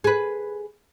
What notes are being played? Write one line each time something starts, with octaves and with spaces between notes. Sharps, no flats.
G#4 B4